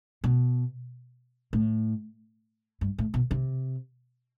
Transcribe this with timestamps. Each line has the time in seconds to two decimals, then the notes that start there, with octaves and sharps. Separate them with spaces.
0.24 B2
1.53 A2
2.81 G2
2.98 A2
3.14 B2
3.31 C3